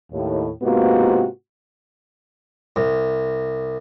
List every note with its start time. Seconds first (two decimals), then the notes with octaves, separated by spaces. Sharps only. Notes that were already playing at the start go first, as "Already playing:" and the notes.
0.12 D#2 A2
0.62 G#2 C3 A#3 B3 F4 F#4
2.76 C2